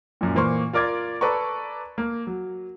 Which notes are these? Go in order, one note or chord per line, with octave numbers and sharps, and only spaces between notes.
F#2 A#2
A#2 E3 A#3 C5 C6 C#6
F4 A#4 D5 D6 G#6 A6
A4 B4 D5 A#5 C#6
A#3
F#3